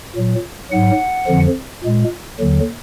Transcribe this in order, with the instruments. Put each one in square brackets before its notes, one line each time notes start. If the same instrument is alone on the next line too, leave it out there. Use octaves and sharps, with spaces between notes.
[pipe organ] A#2 F#3
G#2 F#3 F#5
F2 D3 F3
A#2 G#3
D#2 D3 F#3